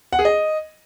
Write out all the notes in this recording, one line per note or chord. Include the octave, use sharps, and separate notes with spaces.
F#5
G#4
D#5